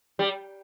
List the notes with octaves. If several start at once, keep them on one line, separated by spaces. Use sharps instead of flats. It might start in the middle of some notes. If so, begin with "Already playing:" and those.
G3